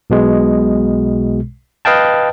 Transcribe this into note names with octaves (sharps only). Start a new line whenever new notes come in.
B1 B2 G#3
B4 D#5 F5 G5 A5